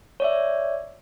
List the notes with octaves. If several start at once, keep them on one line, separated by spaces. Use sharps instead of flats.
C#5 D5 E5